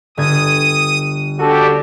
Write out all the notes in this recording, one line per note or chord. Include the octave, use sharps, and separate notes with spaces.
G1 D#6 G#6
D#2 D4 F#4 G4 A4